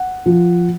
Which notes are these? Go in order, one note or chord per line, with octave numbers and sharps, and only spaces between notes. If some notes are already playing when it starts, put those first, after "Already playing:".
Already playing: F#5
F3